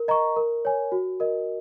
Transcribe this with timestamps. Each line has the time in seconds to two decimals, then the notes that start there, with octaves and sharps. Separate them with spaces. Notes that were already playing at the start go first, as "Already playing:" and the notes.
Already playing: A#4
0.08 D#5 A#5 C#6
0.36 A#4
0.65 C#5 G#5
0.92 F#4
1.20 A#4 D#5